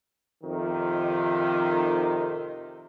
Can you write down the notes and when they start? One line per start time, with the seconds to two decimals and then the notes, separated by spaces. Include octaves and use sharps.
0.43 F2 C3 D#3